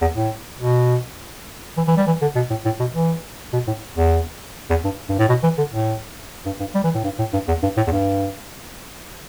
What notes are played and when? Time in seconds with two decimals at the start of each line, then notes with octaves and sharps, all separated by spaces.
0.01 E2
0.16 A2
0.60 B2
1.77 E3
1.87 E3
1.97 G3
2.07 E3
2.22 D3
2.36 B2
2.50 A2
2.65 A2
2.80 B2
2.94 E3
3.53 B2
3.67 A2
3.97 E2
4.70 E2
4.84 G2
5.09 G2
5.19 A2
5.29 B2
5.43 E3
5.58 D3
5.73 A2
6.46 G2
6.60 G2
6.75 G3
6.84 E3
6.95 A2
7.04 G2
7.19 A2
7.33 G2
7.48 E2
7.63 G2
7.77 A2
7.87 E2
7.92 G2